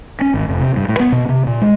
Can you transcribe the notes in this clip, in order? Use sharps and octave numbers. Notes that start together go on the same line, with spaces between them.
C#4
G#1
F1
C3
G2
A2
B3
B2
C3
A#2
G#3